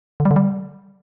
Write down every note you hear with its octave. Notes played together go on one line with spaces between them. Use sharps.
D3
G3
D3
G3